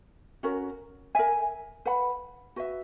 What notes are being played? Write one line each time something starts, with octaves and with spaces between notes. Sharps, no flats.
C#4 F#4 A#4
A#4 E5 G#5
B4 F#5 B5
F#4 B4 E5